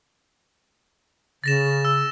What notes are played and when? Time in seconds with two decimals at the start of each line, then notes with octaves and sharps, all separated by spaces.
1.44 C#3 A6 A#6 E7
1.85 E6